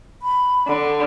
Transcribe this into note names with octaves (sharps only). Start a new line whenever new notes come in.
B5
D3